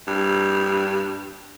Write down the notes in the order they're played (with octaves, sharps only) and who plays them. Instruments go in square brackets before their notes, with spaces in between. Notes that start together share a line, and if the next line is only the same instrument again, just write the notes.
[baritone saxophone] G2